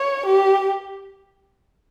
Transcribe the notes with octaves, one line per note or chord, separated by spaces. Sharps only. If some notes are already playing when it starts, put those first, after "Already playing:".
Already playing: C#5
G4